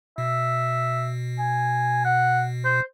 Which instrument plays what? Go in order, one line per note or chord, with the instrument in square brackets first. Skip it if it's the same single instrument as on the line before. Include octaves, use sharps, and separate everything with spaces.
[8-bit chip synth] B2 [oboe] E5
[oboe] G#5
F#5
C5